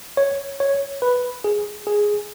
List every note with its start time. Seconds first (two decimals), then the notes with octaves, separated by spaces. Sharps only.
0.17 C#5
0.60 C#5
1.02 B4
1.44 G#4
1.87 G#4